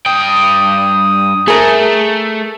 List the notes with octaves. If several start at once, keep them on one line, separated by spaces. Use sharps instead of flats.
G2 G5 D#6
A3 G#4 A#4